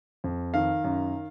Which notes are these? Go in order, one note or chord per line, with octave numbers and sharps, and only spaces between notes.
F2
D#3 F5
F#2